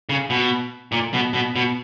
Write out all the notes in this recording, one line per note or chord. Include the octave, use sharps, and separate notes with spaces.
C#3
B2
A#2
B2
B2
B2